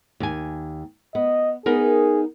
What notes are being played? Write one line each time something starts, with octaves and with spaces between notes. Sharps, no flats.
D#2 G#5
B3 D#5
B3 D#4 G#4 A#4